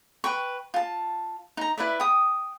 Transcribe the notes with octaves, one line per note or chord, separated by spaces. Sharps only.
B4 G5 C#6
F4 A5
D#4 A#5
E4 B4 D5 E5
G5 D#6